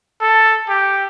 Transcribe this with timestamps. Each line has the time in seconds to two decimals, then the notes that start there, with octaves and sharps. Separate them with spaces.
0.21 A4
0.69 G4